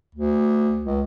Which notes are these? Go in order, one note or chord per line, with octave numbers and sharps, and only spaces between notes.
D2
C#2